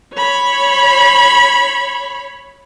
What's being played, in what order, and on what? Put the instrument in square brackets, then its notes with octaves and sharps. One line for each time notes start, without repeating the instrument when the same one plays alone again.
[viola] C#5 B5